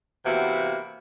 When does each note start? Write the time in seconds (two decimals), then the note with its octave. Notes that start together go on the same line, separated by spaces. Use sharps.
0.25 C3 E3 A#3 B3 F#4